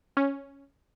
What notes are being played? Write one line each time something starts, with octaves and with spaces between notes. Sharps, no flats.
C#4